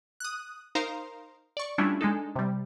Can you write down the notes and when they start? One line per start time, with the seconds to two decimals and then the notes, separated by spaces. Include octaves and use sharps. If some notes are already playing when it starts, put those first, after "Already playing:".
0.20 D#6 F#6
0.75 D#4 A#4 C5 F5 A#5 C6
1.57 D5 C#6
1.78 G3 A3 C#4 D4 E4 F4
2.01 G#3 D4 D#4 A4
2.36 C3 G3